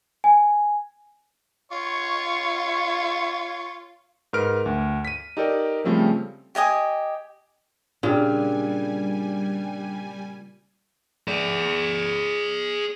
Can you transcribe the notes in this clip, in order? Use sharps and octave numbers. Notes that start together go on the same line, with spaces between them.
G#5
F4 C#5 C#6
G#2 A#4 B4 F6 D7
D2
B6 D#7
D#4 G4 A4 A#4 D5
C#3 F3 G3 A3 C4 C#4
G4 D#5 G#5 D#6
A#2 C#3 G3 D4 F4 G4 G#5
G#4 D5